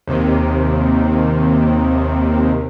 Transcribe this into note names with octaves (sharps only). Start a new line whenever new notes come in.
D#2 C3 D#3